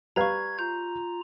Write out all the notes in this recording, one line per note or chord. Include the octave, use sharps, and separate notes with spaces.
G3 B4 F5 A#5 C#6 G#6
F4 A#5 G6